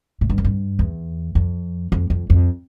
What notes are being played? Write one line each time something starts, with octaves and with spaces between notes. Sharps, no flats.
A2
G2
F2
G2
E2
F2
F2
F2
F2